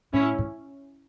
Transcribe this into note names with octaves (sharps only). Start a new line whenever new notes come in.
A2 C#4 E4
A2